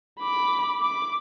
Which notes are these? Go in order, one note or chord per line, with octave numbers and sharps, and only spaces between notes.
B5 D6
D6